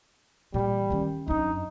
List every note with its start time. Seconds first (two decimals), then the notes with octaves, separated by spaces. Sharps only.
0.54 A#2 E3 G3
0.90 D#3 C#4
1.28 F#2 D4 D#4